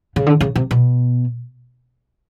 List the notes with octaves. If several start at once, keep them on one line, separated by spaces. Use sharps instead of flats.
C#3
D3
C#3
C3
B2